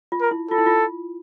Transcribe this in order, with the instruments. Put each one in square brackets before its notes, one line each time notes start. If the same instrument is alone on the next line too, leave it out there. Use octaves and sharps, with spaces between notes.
[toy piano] F4
[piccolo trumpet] A#4
[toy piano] E4
[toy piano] F4 [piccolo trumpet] A4
[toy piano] E4
F4